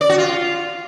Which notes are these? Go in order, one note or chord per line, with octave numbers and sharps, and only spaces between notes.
D5
F#4
F4